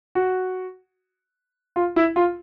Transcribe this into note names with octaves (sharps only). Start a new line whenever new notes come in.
F#4
F4
E4
F4